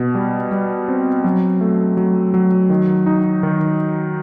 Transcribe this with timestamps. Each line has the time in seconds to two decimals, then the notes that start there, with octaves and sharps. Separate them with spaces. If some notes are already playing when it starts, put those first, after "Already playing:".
Already playing: B2
0.15 G3
0.52 G3
0.89 C4
1.24 F#3
1.61 A3
1.97 F#3
2.34 F#3
2.70 D#3
3.06 D#4
3.43 D#3